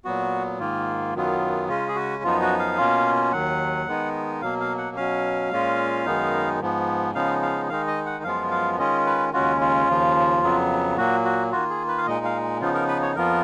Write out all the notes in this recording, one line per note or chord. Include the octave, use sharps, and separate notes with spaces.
A#2 F#3 B3 F#4
G#2 D#3 A#3 F4
F#2 D#3 F#3 B3 F4
C#3 G#3 C#4 F4
G#4
F#4
F#2 F3 B3 D#4 F4
F#4
F5
B2 A#3 C#4 F4
D#2 D#3 F#3 F#5
D#3 G#3 B3 D#4
B2 F#3 A#3 F5
F5
F#5
B2 F#3 C#4 F5
A#2 G#3 C#4 F4
F#2 D#3 G#3 B3 D#4
G#2 F3 B3
C#3 F3 G#3 B3 D#4 F5
F5
D#3 G#3 D#4 F5
D#5
F#5
F#2 F3 G#3 B3 F4 F5
F5
D#3 G#3 C#4 F4 D#5
B4
D#2 C#3 G#3 C#4 F4 F#4
F4
D#2 C#3 F3
F2 C#3 F#3 B3
A#2 F#3 A#3 F#4
F#4
D#3 A#3 F4 F#4
G#4
B4
F5
A#2 G#3 D#4 D#5
F5
C#3 F3 B3 D#4 F4
A#4
B4
C#5
F2 F3 B3 F4 A#4